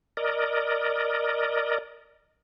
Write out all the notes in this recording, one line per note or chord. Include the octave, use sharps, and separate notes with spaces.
A#4 D5 D#5